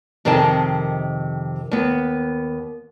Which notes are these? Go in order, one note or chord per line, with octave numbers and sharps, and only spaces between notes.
F2 C3 D#3 G#4 G5 A5
D#2 B3